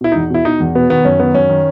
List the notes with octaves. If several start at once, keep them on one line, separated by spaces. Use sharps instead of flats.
B2 E4
E2 D#4
B2 E4
B2 D#4
E2
B2 B3
D#3 B3
F#2 C#4
D#3 B3
F#2 C#4
D#3